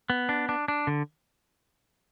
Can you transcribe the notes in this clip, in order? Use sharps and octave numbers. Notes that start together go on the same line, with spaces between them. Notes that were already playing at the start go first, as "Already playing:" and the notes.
B3
D4
D4
D4
D3